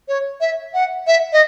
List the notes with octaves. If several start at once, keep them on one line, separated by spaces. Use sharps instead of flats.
C#5
E5
F#5
E5
D#5